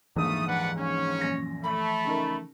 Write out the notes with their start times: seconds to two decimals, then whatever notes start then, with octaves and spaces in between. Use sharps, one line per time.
0.16 A#1 D#2 G#2 E3 F3 A3 D#6
0.47 D4 B4 F#5
0.78 C#4 C#5
1.21 F#2 A#2 A#6
1.64 A3 B5
2.05 C#3 D#4 A#4